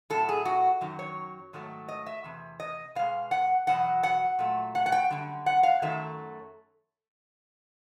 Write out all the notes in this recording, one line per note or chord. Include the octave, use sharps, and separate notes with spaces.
A2 F#3 A3 A4
G#4
F#4
F#2 D#3 F#3
C#5
G#2 D#3 F#3 A3
D#5
E5
E2 C3
D#5
B2 G#3 F5
F#5
E2 B2 F#3 F#5
F#5
A#2 F#3 A3
F#5
F#5
G5
F#2 D3 G3
F#5
F5
F#2 D#3 F#3 A3 E5